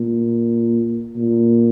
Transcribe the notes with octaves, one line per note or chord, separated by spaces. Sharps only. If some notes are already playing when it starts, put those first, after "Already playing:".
Already playing: A#2
A#2